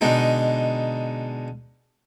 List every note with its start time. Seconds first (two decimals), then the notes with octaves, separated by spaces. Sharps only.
0.01 B2 D3 G#3 D#4